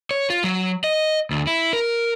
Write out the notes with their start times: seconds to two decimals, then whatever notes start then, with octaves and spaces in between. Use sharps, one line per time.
0.11 C#5
0.30 F4
0.44 F#3
0.84 D#5
1.31 D2
1.47 E4
1.73 A#4